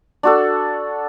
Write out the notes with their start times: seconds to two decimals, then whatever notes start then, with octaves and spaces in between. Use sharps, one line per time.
0.23 D4 F#4 A4